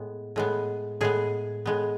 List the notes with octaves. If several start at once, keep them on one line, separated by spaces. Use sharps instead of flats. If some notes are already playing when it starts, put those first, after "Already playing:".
Already playing: A2 G#3 B3
A2 G#3 B3
A2 G#3 B3 G#4
A2 G#3 B3